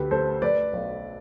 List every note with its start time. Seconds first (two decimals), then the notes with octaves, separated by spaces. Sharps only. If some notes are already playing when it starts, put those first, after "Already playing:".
Already playing: D2 G4 B4
0.11 A3 A4 C5
0.42 A3 B4 D5
0.73 B1